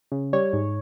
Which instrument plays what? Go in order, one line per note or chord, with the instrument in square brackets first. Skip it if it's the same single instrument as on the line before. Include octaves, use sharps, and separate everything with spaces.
[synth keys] C#3
G3 C#5
G#2